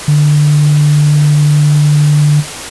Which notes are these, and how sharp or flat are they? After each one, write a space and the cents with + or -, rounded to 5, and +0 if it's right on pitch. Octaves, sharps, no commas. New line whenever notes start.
D3 +15